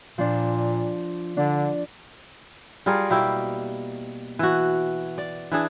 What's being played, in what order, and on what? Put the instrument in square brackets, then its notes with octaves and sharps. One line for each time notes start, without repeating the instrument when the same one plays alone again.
[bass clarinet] A#2 [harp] F3 D4
[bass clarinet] D3 [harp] D4
[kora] G3 F4 G#4 A#4
B2 A#3 E4 G4
E3 F#4
D5
E3 D4 G#4